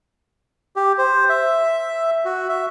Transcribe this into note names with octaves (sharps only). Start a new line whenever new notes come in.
G4
C5
E5
F#4
E5